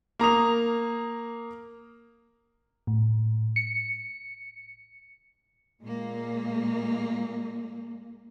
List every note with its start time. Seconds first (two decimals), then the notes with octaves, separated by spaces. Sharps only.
0.19 A#3 A#5 D#6 F7
2.87 A2
3.56 C#7
5.80 A#2 G#3 A#3